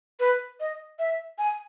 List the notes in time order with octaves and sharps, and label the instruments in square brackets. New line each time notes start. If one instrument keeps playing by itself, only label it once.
[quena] B4
D#5
E5
G#5